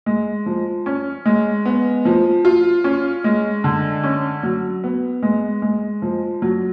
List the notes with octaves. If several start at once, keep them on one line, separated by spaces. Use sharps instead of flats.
G#3
F3
C#4
G#3
B3
F3
F4
C#4
G#3
D3
C#4
F#3
B3
G#3
G#3
F3
F#3